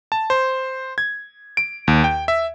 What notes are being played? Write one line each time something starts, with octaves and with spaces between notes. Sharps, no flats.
A5
C5
G#6
D7
D#2
G5
E5